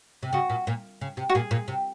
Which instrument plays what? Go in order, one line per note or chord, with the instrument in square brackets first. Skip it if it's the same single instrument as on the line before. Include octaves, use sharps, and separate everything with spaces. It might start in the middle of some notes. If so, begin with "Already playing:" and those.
[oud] C3
[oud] C#3 [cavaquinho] F#4
[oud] A#2
A#2
C#3
C3
[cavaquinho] F#4
[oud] A#2 [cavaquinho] G#4
[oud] A#2
C3